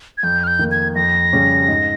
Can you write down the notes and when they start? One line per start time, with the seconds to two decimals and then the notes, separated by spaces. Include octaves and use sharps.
0.18 G#6
0.23 F2 G6
0.44 F6
0.47 G6
0.59 D#3 A#3
0.72 G#6
0.96 F2 A#6
1.33 C#3 G3 C#4 G4
1.68 G#2